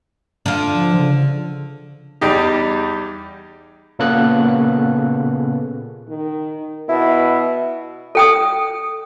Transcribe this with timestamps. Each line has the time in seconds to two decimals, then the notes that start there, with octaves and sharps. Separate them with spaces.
0.46 D3 F4
0.74 F3
0.97 C#3
2.21 E2 G3 D#4 G4
3.99 A#2 C#3 A#3 B3 A4 F#6
6.08 D#3
6.89 B2 E4
8.15 A4 G5 D#6